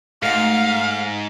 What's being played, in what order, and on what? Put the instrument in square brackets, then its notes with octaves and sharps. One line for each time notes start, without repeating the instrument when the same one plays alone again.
[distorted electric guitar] G#2 [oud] A3 F#4 [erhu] F5